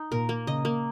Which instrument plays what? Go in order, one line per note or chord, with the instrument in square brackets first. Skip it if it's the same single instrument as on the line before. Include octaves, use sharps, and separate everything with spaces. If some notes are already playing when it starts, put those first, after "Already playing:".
Already playing: [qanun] D#4
[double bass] A#2 [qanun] A#4
[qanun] A#3
[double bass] C#3 [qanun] D#5
[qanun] A#3